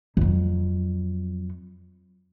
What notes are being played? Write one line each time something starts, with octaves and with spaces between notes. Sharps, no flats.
F2 F#3